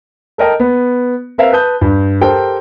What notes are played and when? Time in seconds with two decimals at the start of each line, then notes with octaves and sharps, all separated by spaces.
0.38 A4 A#4 D#5 G5 A5
0.60 B3
1.38 C4 A#4 B4 E5 F5
1.52 B4 A5 D#6 G6
1.81 G2
2.21 G4 A4 A#4 C5 G5